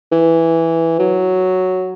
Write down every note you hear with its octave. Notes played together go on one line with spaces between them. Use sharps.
E3
F#3